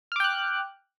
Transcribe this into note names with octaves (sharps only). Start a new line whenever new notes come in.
G5 D6 F6 F#6